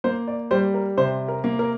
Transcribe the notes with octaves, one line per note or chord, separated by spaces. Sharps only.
A#3 C5
D5
G3 C5
A#4
C3 C5
A#4
A#3
A#4